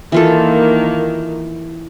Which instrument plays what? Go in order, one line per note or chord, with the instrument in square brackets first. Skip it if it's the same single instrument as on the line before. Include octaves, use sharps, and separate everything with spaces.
[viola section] D#3 A#3 [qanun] E3 F4 A4